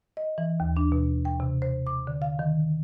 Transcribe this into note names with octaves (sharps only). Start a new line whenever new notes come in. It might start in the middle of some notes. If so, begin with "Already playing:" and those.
D#5
E3
D#2
D4
B2
G5
C3
C5
D6
D3
F5
D#3